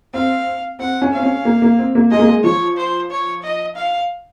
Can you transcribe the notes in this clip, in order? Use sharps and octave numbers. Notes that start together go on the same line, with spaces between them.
C4 F5
C4 F#5
C#4
C4 F5
C#4
A#3
A#3
C4
A#3
G#3 D#5
A#3
G#3
F3 C#5
C5
C#5
D#5
F5